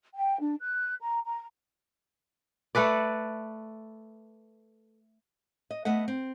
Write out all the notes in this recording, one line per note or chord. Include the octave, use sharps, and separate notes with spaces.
G5
D4
F#6
A#5
A#5
A3 A4 B4 D5
D#5
A3 B3 D#5 F#5
C4